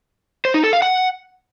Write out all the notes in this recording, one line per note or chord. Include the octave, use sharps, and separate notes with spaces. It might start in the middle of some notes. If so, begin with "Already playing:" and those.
C5
D#4
A4
F5
F#5